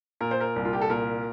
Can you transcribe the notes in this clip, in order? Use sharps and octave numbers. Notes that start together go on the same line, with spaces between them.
A#2 A#4
C5
A#4
C2
F4
G4
A4
A#2 A#4